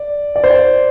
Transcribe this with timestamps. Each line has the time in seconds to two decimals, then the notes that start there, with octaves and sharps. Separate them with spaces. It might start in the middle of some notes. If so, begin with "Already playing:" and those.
Already playing: D5
0.36 D5
0.44 C5
0.51 D5